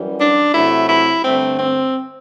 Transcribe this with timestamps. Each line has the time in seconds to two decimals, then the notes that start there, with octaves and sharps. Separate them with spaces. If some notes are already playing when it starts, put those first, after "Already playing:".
Already playing: F#2 E3 G3
0.19 D4
0.54 C3 F#3 A3 E4
0.89 E4
1.24 G2 D3 A3 C4
1.59 C4